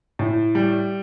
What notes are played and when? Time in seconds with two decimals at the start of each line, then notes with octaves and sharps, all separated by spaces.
0.19 A2
0.55 G3